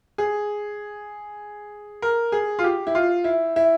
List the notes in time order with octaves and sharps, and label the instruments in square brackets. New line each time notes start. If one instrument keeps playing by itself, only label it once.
[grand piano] G#4
A#4
G#4
F4
G4
E4
F4
E4
E4